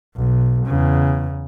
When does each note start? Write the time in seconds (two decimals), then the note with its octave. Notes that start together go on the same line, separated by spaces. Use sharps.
0.16 B1
0.66 E2 C#3